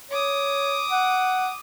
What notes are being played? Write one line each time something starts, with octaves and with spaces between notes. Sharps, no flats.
C#5 D6 D#6
F#5